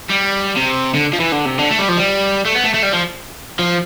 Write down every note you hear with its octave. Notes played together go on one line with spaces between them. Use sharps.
G3
C3
D3
F3
E3
D3
C3
D3
A3
G3
F3
G3
A3
B3
A3
A3
G3
F3
F3